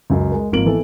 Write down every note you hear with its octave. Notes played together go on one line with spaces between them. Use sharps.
C#2 F#2
G#3 A#4
G#1 F3 A#3 D7 F#7
E3 B3 A4